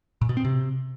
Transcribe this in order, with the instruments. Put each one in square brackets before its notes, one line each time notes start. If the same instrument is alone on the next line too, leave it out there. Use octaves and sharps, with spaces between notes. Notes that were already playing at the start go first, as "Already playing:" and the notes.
[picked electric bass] A#2
B2
C4
C3